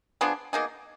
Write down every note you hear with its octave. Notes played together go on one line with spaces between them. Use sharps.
F3 B3 D4 G#4
B2 A#3 D#4 G#4